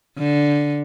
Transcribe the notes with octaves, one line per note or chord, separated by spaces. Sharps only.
D3